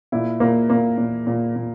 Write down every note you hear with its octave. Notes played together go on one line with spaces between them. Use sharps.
A#2 E4
A#2 A#3
A#2 A#3
A#2
A#2
A#2